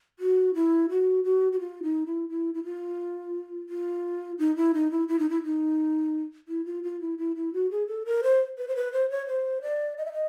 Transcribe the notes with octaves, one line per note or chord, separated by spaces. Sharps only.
F#4
E4
F#4
F#4
F#4
F4
D#4
E4
E4
E4
F4
F4
D#4
E4
D#4
E4
E4
D#4
E4
D#4
E4
F4
F4
E4
E4
E4
F#4
G#4
A4
A#4
C5
B4
C5
B4
C5
C#5
C5
D5
D#5
E5
D#5